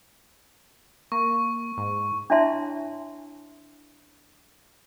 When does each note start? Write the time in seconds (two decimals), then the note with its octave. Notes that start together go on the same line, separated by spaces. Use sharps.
1.12 A#3 C#6
1.77 G#2
2.30 D4 E4 C#5 E5 A5 C6